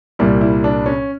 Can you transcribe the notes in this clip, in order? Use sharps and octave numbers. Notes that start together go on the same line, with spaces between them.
C2 A#2 G3 E4
E4
D4
C#4